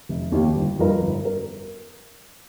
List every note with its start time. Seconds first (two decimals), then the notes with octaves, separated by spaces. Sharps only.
0.09 F1
0.32 D#2 D#3 A#3 G4
0.56 G1
0.79 G2 F3 D#4 A#4
1.02 G1
1.25 A#4